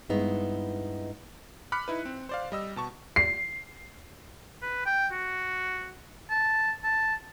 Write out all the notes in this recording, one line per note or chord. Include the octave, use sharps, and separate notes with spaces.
G2 G#3 B3 D#4 E4
B5 D6 F6 F#6 B6 C#7
D#4 E4 B4
C4
C5 D5 F5
G3 D#5 E6
B2 A5 C#6
C7
B4
G5
F#4
A5
A5